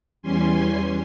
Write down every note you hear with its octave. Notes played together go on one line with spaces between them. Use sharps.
E2 E3 G3 C#4 G#5 C6